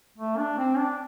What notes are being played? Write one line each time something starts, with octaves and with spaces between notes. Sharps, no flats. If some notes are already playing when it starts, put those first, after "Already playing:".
A3
D4
C4
D4